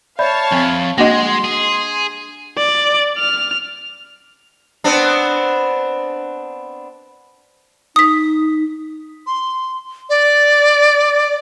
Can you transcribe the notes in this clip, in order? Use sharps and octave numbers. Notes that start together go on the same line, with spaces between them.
C#5 D5 E5 F5 A5 B5 G6
F2 C4
G#3 A#3 D4 F#4 D#5 F#5 C6 A#6
G#4
D5
F6
B3 C4 D4
D#4 D#6 B6
C6
D5